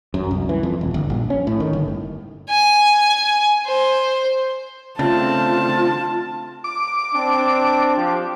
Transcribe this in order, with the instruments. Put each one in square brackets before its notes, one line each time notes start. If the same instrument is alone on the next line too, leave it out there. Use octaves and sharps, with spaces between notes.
[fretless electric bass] F#2
C2
E3
F2
D#1
G1
A#1
C#4
A2
D#3
G1
[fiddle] G#5
C5
[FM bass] C#3 [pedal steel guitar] A3 C4 D4 [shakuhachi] F4 [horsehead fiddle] A5
[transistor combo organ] D6
[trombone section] C4 D4
F3 G4